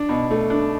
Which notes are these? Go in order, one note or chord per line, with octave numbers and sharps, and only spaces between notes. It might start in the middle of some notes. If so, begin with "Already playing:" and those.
Already playing: D4
B2
A3
D4